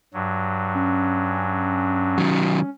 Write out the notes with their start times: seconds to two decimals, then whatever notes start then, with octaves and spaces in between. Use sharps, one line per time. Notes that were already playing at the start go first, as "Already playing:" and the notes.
0.14 G2 F#3
0.75 C#4
2.18 D#3 F#3